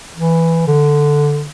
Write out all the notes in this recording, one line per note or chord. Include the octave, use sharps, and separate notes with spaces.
E3
D3